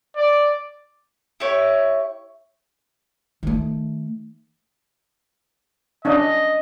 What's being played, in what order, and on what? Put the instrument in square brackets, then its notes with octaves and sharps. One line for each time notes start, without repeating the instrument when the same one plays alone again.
[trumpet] D5
[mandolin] E4 G4 C#5
[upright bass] D#3 A3
[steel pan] C#4 D4 [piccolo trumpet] D#5